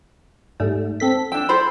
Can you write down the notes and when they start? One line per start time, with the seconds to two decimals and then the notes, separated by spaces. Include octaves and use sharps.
0.60 G#2 G3 A3
1.00 C4 A4 B6
1.32 D4 G5 E6
1.49 A4 C5 B5